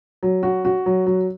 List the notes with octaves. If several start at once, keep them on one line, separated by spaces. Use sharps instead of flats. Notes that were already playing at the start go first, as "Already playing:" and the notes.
F#3
F#4
F#4
F#3
F#3